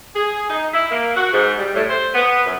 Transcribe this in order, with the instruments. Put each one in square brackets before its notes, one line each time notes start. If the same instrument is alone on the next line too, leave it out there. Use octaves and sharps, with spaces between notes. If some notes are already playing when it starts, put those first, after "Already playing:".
[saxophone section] G#4
D#4
E4
A#3
F#4
G#2
G3
A2
C5
B3
F#2